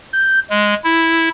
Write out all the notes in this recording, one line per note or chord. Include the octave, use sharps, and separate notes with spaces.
G6
G#3
E4